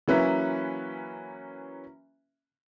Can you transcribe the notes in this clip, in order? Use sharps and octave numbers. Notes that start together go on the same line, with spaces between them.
E3 F#3 A#3 C#4 B4 E5